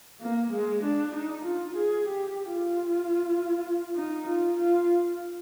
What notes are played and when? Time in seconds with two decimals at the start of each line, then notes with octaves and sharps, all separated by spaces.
0.21 A#3
0.53 G#3
0.84 D4
1.15 D#4
1.46 F4
1.77 G#4
2.08 G4
2.54 F4
3.95 D#4
4.26 F4
4.57 F4